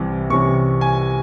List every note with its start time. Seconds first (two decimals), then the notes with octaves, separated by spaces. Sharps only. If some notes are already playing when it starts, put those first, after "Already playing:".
Already playing: C2 C3 E3 G3
0.30 C2 C3 E3 G3 C#4 C#6
0.81 G#5